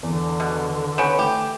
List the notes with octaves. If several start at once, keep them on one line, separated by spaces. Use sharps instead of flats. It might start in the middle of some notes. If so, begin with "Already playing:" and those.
E2 D3
B2
B3 C#4 G6 D7 E7
A3 G4